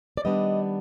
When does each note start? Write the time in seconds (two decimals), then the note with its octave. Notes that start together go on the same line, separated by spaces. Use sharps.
0.17 D5
0.25 D#3 G3 B3 D4 D#5